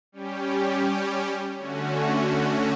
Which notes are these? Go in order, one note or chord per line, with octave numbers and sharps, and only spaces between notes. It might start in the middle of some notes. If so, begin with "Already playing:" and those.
G3 C#4 G4
D3 A3 C#4 F#4